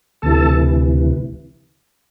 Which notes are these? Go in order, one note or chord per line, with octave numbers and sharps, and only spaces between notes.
D2 C3 E3 A4 A5